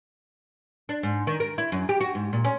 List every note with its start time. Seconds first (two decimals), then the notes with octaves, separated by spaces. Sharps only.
0.89 D4
1.03 G#2
1.27 D#3
1.40 A#4
1.58 E4
1.72 F#2
1.89 G4
2.00 F#4
2.15 G#2
2.33 A#2
2.45 C#4